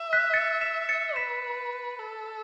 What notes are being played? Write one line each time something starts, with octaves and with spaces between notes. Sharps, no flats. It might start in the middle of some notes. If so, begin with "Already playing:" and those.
Already playing: E5
F#6 B6
A6 C#7
B6 E7
A6 C#7
B4 B6 E7
A4